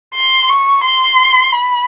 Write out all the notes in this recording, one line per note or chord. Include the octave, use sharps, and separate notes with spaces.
C6
C#6
C6
B5